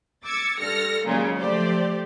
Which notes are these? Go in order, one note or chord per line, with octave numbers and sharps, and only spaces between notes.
D6 E6 G#6 A6 C#7
G2 A4 F6 A#6 C#7
D#2 A#2 C#3 F#3 G#3
F3 A3 G4 C5 D5